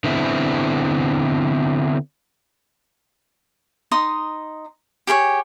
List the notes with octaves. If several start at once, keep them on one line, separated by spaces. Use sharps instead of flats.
D3 B3 C4 E4
D#4 C6 D#6
G4 G#4 B4 C#5